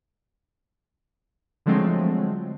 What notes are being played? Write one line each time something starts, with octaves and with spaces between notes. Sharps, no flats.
D3 F3 F#3 G#3 A3 C4